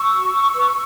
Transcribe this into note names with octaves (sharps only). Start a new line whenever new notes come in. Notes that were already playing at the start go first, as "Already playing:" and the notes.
Already playing: C#6 E6
F#4
B4